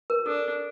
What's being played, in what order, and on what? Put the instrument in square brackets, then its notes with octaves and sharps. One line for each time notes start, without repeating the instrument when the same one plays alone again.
[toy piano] A#4
[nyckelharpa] D4 [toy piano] A4